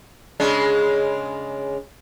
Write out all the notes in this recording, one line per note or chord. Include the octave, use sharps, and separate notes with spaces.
C#3 G#3 D4